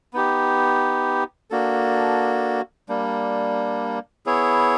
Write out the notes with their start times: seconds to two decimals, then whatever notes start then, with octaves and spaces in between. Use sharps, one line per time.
0.13 B3 D#4 G4
1.51 A#3 D4 F#4 A4
2.89 G3 A#3 D4
4.26 B3 E4 G#4 C#5